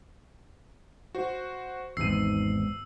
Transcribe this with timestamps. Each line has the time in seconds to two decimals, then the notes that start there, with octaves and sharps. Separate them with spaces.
1.15 F#4 C5
1.97 G#1 E2 G#2 E6 C7 D#7